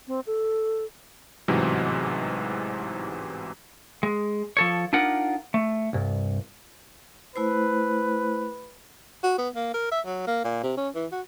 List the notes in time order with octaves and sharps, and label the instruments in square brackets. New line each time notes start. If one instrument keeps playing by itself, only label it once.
[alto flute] C4
A4
[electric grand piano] A1 G#2 C3 E3 F#3
[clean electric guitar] G#3
F3 A4 C#5
D4 D#4 F4 A#4 F#5
A3
C2 G2
[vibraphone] A3 E4 C5 [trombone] B4
[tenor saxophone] F#4
B3
A#3
A#4
E5
F#3
A#3
A#2
C3
C#4
E3
F#4